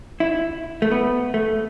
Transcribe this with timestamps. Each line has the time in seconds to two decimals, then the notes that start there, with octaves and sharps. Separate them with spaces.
0.20 E4
0.82 A3
0.91 B3
1.34 A3